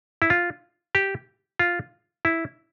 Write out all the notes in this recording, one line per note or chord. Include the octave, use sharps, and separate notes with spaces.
E4
F4
G4
F4
E4